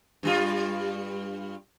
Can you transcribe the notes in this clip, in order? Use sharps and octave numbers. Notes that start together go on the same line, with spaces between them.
G2 G3 F4